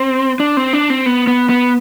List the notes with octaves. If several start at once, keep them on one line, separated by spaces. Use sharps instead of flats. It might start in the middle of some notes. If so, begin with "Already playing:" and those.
Already playing: C4
D4
C4
D4
C4
B3
B3
B3